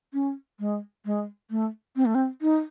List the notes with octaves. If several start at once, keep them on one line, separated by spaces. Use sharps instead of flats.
C#4
G#3
G#3
A3
C4
A3
C4
D#4